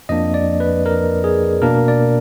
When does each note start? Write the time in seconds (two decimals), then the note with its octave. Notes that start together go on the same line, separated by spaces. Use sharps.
0.09 F2 F3 A#3 D4 D#5
0.34 D5
0.60 B4
0.86 A#4
1.24 G#4
1.62 B2 A#3 D4 A#4
1.88 D5